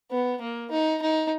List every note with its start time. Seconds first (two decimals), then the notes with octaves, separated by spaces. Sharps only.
0.11 B3
0.41 A#3
0.71 D#4
1.02 D#4